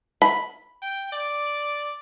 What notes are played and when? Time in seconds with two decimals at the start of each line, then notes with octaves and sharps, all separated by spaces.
0.22 B5
0.82 G5
1.12 D5